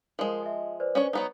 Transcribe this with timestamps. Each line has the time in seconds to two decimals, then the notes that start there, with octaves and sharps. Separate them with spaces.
0.19 F3 G#3 A#4 D#6
0.42 D#5 E5
0.80 B4 C5 D5
0.95 C#4 D4 C#5
1.13 F#3 B3 D#4